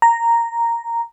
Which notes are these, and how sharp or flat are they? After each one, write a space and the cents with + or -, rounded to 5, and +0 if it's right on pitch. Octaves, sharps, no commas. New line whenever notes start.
A#5 -5